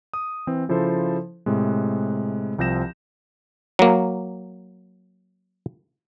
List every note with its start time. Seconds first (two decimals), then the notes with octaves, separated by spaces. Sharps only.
0.14 D#6
0.47 E3 C4
0.69 C#3 F3 E4 A4 C5
1.46 A2 C3 G#3
2.59 C2 F3 C4 G6 A#6 E7
3.79 F#3 A#3